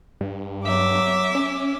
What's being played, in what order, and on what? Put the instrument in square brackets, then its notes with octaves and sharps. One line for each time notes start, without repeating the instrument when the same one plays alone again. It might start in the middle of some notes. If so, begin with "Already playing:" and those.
[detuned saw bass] G2
[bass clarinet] F#3 [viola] E5 D6
[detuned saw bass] C#4